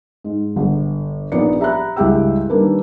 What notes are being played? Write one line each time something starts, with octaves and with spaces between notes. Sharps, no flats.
G#2
G1
A#1 A#2 B3 D#4 D5 C#7
G4 E5 A#5 B5 F#6
C#2 G2 E4 G4 G5 E6
D#3 G3 A#3 D4 B4